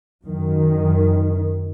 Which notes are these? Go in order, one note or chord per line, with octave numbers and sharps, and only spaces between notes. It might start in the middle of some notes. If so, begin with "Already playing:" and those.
F#2 D#3